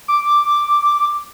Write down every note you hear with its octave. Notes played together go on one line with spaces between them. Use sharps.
D6